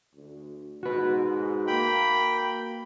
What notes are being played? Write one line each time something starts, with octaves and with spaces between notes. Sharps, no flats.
D2
G#2 F#4 B4
A#3 G5 B5